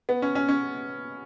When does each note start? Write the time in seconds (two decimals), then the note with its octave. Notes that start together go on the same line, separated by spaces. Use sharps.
0.09 B3
0.22 C#4
0.35 C#4
0.49 C#4